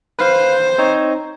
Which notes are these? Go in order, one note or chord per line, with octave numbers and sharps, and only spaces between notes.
B4 C5 F5
C4 D#4 C#5